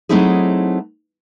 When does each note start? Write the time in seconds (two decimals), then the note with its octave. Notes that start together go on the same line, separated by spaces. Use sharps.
0.09 F#3 A3 C4 D#4 E4 G#4